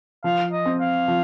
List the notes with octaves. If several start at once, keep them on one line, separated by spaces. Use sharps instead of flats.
F3 F5
D#5
C4
F5
F3